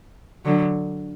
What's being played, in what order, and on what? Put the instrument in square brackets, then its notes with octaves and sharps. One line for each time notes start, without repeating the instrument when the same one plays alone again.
[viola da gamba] D3 F#3